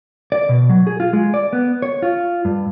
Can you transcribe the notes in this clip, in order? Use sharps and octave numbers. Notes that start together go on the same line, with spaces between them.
D5
B2
F#3
G#4
F4
G#3
D5
B3
C#5
F4
G2